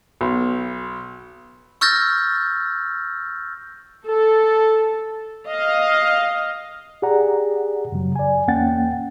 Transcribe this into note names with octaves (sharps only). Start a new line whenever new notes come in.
B1
C#6 E6 F6 G6 A6 A#6
A4
D#5 F5
G4 G#4 D5 F#5 A#5
F#2 C#3 F#3
D5 G#5
E2 A#3 C#4 F#5 G5 A6